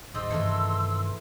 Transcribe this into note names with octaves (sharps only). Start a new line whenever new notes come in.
D1 G#2 D5 D#5 C6 E6
G2 C3 D#3 E3 A3 A#4